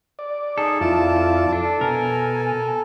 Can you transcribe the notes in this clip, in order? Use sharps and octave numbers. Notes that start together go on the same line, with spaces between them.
D5
D#4 G#4 A4
F2 E4 F4 D5 A5
D4 A4
B2 A#4 G#5